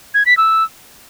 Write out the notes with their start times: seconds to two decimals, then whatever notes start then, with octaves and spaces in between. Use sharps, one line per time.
0.14 G#6
0.26 B6
0.37 E6